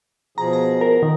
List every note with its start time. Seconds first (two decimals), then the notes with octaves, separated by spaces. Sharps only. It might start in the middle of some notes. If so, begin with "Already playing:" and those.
0.38 B2 F3 G#4 A#5
0.53 A#5
0.81 A#4
1.02 D#3